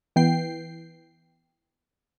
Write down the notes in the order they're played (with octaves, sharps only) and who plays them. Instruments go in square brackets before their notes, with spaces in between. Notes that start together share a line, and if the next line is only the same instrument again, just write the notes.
[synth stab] E3 B3 G5 C7